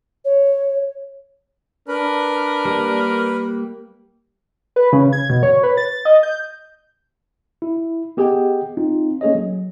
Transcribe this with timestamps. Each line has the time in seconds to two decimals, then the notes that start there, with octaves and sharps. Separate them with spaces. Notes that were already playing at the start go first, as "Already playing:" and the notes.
0.25 C#5
1.88 D4 A#4 B4
2.65 G3 A#3
4.76 B4
4.93 C#3
5.13 G#6
5.30 B2
5.43 C#5
5.63 B4
5.77 A6
6.05 D#5
6.23 G6
7.62 E4
8.17 B3 G4 G#4 D#5 F#5 G5
8.77 C4 D#4 F4
9.21 A#3 C#4 G#4 A4 C#5 D#5
9.35 F#3